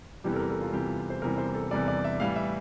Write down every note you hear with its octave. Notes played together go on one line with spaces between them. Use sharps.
E2 C3 E3 G3 G4
A4
A#4
A4
F4
E2 C3 E3 G3 G4
C5
E2 C3 E3 G3 A#4
C5
A4
E2 C3 E3 G3 D5
D5
E5
A2 E3 G3 F5
E5